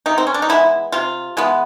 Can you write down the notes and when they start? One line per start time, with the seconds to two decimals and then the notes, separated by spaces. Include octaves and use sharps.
0.06 C3 D#4
0.18 C4
0.27 C#4
0.34 D4
0.42 D#4
0.49 E3 G#3 B3 E4
0.92 C3 F4
1.37 E3 G#3 B3